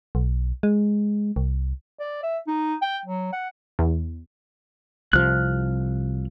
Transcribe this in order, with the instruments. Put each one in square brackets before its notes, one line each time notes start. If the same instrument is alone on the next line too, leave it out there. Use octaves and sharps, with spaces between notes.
[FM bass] B1
G#3
C2
[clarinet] D5
E5
D#4
G5
F#3
F#5
[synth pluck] E2
[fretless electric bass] C2 F3 [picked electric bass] C3 [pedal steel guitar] F6 F#6